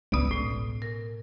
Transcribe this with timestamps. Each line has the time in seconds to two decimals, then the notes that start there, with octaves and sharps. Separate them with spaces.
0.12 G#1 C#2 B2 B3 D5 D#6
0.31 A2
0.82 A#4